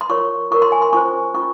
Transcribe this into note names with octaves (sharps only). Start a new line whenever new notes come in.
C6
F4 A#4 C#5 C#6
F4 A#4 C#5 C#6
C6
G#5
C6
C#4 F4 C5 C#6
C#4 F4 C#6